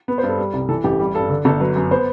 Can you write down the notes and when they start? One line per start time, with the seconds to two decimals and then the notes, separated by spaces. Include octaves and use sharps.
0.08 B3
0.18 C5
0.23 G2
0.29 A4
0.38 G3
0.53 C2
0.69 E3 A4
0.84 A1 G4
0.99 G3 G4
1.15 G2 A4
1.30 D3 A4
1.45 G1 A4
1.60 F#3 B4
1.76 F#2
1.91 B3 C5